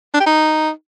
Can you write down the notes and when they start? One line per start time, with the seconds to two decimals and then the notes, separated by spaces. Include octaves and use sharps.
0.14 D4
0.20 G4
0.26 D#4